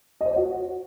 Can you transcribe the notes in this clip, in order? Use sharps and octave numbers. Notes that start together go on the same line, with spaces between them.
D#5
C5
C#5
F#4